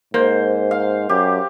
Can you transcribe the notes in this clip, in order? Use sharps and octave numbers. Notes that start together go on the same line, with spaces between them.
G#2 A#3 C5
F5
F#2 G4